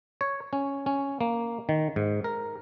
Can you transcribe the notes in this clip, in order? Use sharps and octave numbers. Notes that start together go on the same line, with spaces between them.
C#5
C#4
C#4
A#3
D#3
G#2
A#4